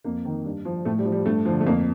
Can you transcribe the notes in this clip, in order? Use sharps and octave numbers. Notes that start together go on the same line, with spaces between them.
F2 A#3
D#3
G2
F3
A2 A3
G3
F3
G3
G2 A3
D3 F3
A3
F2 A#3